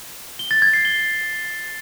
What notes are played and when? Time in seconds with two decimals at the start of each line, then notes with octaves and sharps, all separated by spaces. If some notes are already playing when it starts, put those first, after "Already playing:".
0.39 G7
0.51 A6
0.62 G#6
0.74 C7
0.85 G7